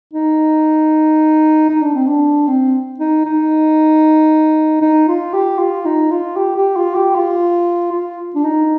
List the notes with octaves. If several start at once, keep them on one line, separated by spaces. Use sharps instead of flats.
D#4
D#4
D4
C4
D4
C4
D#4
D#4
D#4
F4
G4
F4
D#4
F4
G4
G4
F4
G4
F4
F4
D4
D#4